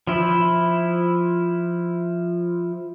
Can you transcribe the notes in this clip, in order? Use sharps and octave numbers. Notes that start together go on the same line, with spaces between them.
F3 E4